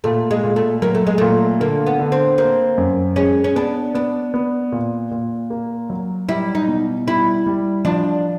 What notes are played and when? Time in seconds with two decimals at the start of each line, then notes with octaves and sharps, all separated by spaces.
0.04 A#2 A3
0.31 G#3
0.44 A#2
0.56 A3
0.82 F#3 A#3
0.95 A3
1.07 G#3
1.18 A#2 A3
1.60 D3 A#3
1.86 B3
1.99 D3
2.12 C4
2.38 A#3 C4
2.78 F#2
3.16 G#3 C#4
3.44 C#4
3.56 B3 D4
3.95 B3 D4
4.34 B3
4.72 A#2
5.11 A#2
5.50 A#3
5.90 F#3
6.29 G3 E4
6.55 D#4
6.68 B2
7.07 G3 E4
7.46 G3
7.85 F3 D4